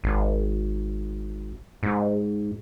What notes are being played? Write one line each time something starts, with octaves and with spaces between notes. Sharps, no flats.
G#1
G#2